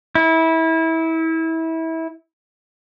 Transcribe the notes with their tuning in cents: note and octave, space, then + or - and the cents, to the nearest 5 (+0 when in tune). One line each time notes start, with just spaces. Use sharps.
E4 -25